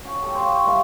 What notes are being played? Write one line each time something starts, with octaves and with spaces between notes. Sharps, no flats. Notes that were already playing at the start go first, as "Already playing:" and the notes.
C#4 F#4
G4 A4
G4 C5 C#5 F5
C#5
G3 A#3 E4 C#6